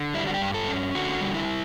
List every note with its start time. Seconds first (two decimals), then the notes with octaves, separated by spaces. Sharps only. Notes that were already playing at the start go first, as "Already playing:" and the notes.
Already playing: D3
0.14 G3 E4
0.27 F#4
0.34 G4
0.42 G2
0.54 A4
0.68 C#4
0.95 D3 F#4
1.21 G3
1.34 E4